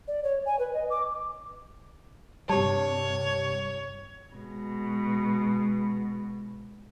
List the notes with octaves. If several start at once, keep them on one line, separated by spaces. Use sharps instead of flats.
D5
C#5
G#5
B4
D#5
D6
G2 C3 G3 G4 C#5 A5
B2 G#3